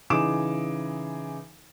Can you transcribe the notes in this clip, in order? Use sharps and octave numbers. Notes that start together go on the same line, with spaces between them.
C#3 E3 D#4 G#4 D6 E7